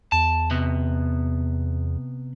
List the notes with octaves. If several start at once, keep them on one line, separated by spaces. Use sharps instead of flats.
E2 A5
C3 B3